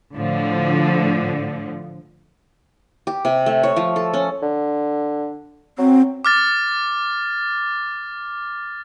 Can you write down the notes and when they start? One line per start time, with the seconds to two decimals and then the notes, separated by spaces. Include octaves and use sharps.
0.15 A2 D3 F3
3.07 G4
3.25 C3
3.46 A3
3.63 C#5
3.76 F3
3.96 A4
4.13 C#4
4.42 D3
5.78 F#3 C4
6.25 D6 F6 A6